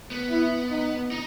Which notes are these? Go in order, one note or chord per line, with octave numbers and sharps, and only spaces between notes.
B3
E4
D#4
D#4